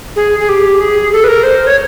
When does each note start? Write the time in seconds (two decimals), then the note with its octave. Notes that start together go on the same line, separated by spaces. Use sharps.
0.16 G#4
0.40 G#4
0.49 G4
0.81 G#4
1.13 A4
1.24 B4
1.28 A#4
1.43 C5
1.67 C#5